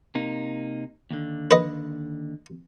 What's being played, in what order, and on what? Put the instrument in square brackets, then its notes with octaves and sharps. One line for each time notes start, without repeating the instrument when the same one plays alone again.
[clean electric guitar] C3 A#3 D#4
D#2 D3
[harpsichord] B4 D#5